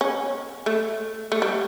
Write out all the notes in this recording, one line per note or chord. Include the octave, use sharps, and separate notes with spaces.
C#4
A3
A3
G3